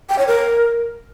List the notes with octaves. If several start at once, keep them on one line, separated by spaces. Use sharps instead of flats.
G5
C#5
A#4